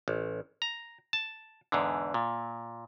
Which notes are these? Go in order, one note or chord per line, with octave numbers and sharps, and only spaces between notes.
A1
A#5
A5
E2 G#2 D3
A#2